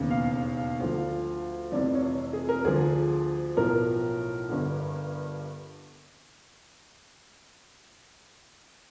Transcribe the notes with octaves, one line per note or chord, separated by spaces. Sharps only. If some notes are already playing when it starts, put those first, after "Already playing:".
Already playing: E1 D#2 C#3
F5
F5
D2 D3 F3
F1 F2 C3 E3 D5
C#5
G#4
A#4
D2 D3 F3 G#4
B1 A2 F3 A#4
G1 G2 D3